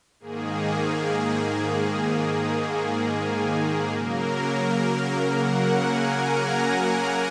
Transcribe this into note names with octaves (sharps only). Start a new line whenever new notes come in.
G#2 D#3 A#3 G#4
C#3 F#3 A#3 A#4
F#5
G#5
A#5
G#5
G#5